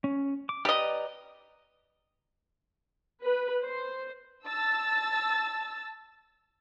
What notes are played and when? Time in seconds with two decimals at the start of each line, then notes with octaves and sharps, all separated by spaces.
0.04 C#4
0.49 D6
0.65 G4 B4 D5 D#5 A#5
3.22 B4
3.63 C5
4.45 A5 E6 A6